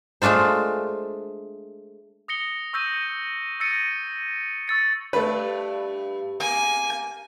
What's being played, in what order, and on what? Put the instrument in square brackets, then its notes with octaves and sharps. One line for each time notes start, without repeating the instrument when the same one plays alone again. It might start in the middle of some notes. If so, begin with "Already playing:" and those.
[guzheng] G#3 A3 D4 F4 C5
[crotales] D#6 A#6 C#7 G7
C#6 E6 G6 A#6 D#7
E6 A6 A#6 C#7 D#7
C#6 E6 A6 C#7
[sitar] G2 [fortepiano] A3 B4
[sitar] A#3 [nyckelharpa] G#5